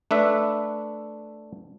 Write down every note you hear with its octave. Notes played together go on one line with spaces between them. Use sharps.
A3 D4 B4 E5